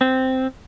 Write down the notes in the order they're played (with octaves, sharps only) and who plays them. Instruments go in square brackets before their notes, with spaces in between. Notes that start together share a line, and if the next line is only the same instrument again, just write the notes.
[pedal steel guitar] C4